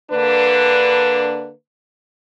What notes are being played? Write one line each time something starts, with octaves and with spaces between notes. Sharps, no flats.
D3 A#3 D4 B4